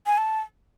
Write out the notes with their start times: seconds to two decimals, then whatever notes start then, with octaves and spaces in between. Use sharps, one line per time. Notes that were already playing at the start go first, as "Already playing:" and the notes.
0.06 G#5
0.18 A5